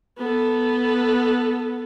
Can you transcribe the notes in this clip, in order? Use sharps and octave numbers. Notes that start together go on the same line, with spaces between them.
B3 A4